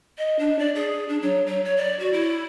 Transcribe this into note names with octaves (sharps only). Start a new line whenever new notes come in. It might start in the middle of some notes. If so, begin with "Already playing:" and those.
D#5
D4
D5
G#4
D4
F#3
F#3
C#5
D5
F#4
E4